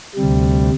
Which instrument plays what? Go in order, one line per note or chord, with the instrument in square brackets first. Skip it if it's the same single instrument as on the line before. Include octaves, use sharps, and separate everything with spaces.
[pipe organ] D2 C3 G3